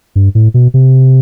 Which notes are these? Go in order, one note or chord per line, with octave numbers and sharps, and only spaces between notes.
G2
A2
B2
C3